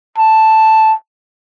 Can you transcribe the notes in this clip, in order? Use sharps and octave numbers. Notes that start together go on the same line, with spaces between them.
A5